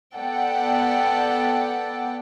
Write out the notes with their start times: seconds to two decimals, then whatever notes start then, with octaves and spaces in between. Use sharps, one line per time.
0.16 B3 A4 D5 F#5 G5